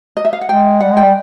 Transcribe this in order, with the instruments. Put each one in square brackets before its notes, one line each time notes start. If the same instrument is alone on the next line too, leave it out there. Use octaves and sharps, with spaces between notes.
[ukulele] D#5
E5
F5
F#5
[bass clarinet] G#3 [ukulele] G5
[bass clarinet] G3 [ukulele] F#5
[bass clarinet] G#3
[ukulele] G5
[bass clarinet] G3